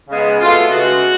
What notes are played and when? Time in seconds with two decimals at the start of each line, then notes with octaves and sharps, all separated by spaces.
0.09 C#3 G#3 B3
0.38 B2 A3 F4
0.68 C#3 G#3 B3 F#4